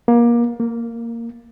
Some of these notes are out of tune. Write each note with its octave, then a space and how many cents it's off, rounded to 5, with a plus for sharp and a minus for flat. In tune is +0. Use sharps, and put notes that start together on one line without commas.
A#3 +25
A#3 -10